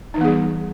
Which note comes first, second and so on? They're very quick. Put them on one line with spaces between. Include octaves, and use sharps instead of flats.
D#4 E3 B3 G#4 G3